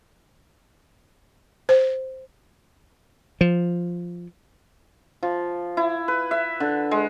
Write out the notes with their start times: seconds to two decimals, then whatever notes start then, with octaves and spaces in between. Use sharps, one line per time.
1.69 C5
3.41 F3
5.23 F3
5.77 E4
6.08 B4
6.31 E5
6.60 D3
6.91 G#3